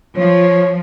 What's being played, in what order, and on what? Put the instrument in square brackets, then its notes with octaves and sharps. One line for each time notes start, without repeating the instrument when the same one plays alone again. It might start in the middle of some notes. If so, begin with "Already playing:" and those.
[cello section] F3 [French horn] C#5